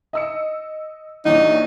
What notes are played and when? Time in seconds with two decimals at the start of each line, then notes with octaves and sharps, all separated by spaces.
0.13 D#5 E6 C#7
1.25 A#1 E3 D#4 C#5